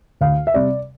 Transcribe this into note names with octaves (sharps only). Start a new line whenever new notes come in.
D2 F5
E5
C3 G3 D5